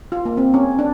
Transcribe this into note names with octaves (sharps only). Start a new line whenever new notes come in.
F4
A#3
C4
C#4
D4